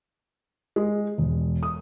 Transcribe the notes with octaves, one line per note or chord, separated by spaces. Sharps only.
G#3
E1
D#6